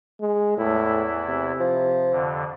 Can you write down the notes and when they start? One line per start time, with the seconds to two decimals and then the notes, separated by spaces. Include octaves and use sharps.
0.21 G#3
0.57 E2 A2 E4
1.28 C3
1.60 F3
2.11 F2 D3